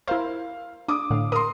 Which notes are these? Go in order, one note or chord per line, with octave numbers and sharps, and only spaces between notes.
E4 A#4 C5 F5
D4 D6 D#6
A2 D3 F5
A#4 C6 D#6